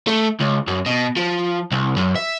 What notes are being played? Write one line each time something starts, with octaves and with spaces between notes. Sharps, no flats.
A3
C#2
F#2
B2
F3
C2
F#2
E5